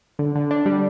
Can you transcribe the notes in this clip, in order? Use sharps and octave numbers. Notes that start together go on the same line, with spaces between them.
D3
D3
D4
G3